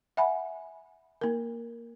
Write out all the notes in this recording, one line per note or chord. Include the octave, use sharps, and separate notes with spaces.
E5 F#5 G#5 B5
A#3 A#4